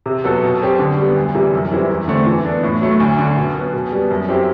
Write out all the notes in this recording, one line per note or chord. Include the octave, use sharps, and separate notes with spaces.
C3
F#3 B3 F#4 A4
B2
F#3 C4 G4
D3
G3 B3
D2
C3 E3 G3
F#2
E3 G3 C4 E4
E2
D3 A3 C4
E3
B3 D4
A2
F#3 A3
D2
D3 A3
B2
F#3 B3
B2
G3 B3
F#2
F#3 C4 E4 G4